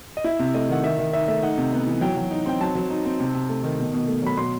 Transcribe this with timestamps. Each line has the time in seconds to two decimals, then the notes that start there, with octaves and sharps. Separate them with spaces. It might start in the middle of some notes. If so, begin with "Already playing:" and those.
0.17 D#5
0.24 E4 E5
0.39 C3
0.54 A3 D#5
0.69 D#3 F#5
0.84 D#3 E5
0.99 D#3 E5
1.13 D#4 E5
1.28 A3 E5
1.42 D#4 F#5
1.58 C3
1.72 B3
1.87 E3
2.01 F#3 G5
2.17 F#3
2.31 D#4
2.46 C4 G5
2.61 F#3 A5
2.75 F#3
2.90 D#4
3.05 C4
3.20 C3
3.35 C3
3.49 A3
3.63 D#3
3.79 B2
3.93 B2
4.08 A3
4.22 F#3 B5
4.37 B2 C6